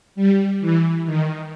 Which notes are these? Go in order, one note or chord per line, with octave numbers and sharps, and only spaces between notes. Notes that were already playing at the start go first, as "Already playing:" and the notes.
G3
E3
D#3